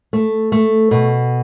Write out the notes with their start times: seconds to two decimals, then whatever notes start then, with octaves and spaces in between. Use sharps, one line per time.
0.13 A3
0.52 A3
0.91 B2